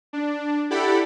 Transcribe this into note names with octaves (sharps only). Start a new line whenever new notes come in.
D4
E4 G4 A4 D5 F#5 B5